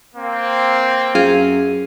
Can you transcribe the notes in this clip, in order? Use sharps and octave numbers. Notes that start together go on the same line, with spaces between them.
A#3 C4
F#2 F4 G#4 F5